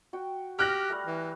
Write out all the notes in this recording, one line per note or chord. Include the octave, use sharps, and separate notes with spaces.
F#4 G5
G4 F6 F#6 A#6
G3 A3
E3